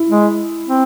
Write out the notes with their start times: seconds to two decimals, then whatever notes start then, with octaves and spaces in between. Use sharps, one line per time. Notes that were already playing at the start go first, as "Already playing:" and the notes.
Already playing: E4
0.09 G#3
0.67 C4